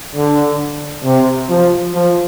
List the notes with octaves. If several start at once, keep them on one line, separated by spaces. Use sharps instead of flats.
D3
C3
F3
F3